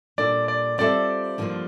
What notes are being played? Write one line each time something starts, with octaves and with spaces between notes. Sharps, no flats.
A#2 G3 D4 A4 D5
D5
G3 C4 F4 A4 D5 E5
G2 D3 F3 A#3 F4